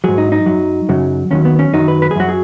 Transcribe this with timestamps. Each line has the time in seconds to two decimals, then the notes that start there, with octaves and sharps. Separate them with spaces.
0.04 G#2 F#3 G#4
0.18 D#4
0.32 D#4
0.46 F#2 F#3
0.89 F#2 C#3 F#3
1.31 D#2 D#3 F#3 C#4
1.45 B3
1.59 C#4
1.73 F#2 D#3 F#3 D#4
1.88 B4
2.02 B4
2.11 G#4
2.16 F#2 F#3 F#4
2.29 G#4